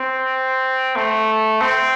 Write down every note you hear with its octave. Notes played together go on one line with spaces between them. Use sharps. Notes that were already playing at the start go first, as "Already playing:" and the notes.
Already playing: C4
A3
C4